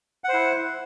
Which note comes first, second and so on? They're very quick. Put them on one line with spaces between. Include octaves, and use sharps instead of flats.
F#5 C5 E4